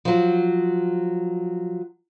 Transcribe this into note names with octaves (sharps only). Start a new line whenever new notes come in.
F3 F#3